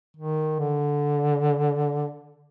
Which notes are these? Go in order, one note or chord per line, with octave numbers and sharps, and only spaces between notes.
D#3
D3